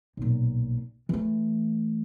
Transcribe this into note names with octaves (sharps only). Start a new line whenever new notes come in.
B1 A#2
E3 A3